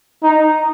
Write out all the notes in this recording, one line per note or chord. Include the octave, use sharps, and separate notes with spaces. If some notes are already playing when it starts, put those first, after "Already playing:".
D#4